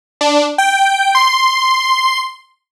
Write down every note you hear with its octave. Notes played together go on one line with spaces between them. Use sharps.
D4
G5
C6